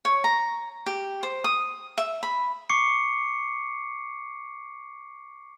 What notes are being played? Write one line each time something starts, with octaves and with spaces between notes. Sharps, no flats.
C#5
A#5
G4
C5
D#6
E5
B5
C#6 D6 C7 C#7